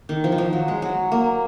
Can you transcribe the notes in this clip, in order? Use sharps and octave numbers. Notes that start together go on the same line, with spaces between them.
D#3
F3
D#3
F3
F#3
G#3
F#3
A#3